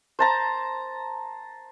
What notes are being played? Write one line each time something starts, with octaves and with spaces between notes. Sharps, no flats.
C5 A5 A#5